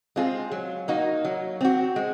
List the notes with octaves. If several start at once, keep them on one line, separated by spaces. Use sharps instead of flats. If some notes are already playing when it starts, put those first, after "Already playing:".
G#3 C4 F4 G#4
F#3
A#3 D#4 F#4
F#3
C4 F#4
G#3